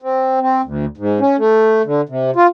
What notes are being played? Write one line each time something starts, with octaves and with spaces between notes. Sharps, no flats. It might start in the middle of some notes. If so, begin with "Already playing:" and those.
C4
C4
D2
G#2
C#4
A3
D3
C3
F4